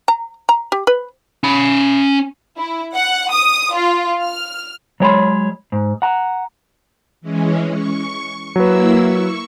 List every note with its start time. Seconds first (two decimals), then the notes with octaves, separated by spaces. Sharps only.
0.08 A#5
0.49 A#5
0.72 G4
0.87 B4
1.44 C#4 B5
2.58 E4
2.94 F#5
3.31 D#6
3.75 F4
4.22 F6
5.00 F#3 G#3 C#5 G5 B5 C6
5.72 G#2
6.02 F#5 A#5
7.21 E3 G#3 C#4
7.72 C#6
8.56 F#3 A#3 E4 B4 E6
9.01 C#6